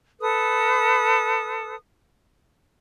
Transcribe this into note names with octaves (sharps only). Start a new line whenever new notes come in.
A4 B4 D#6